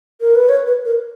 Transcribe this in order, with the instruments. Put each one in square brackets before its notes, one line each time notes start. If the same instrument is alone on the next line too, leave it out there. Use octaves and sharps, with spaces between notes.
[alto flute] A#4
B4
C#5
B4
A#4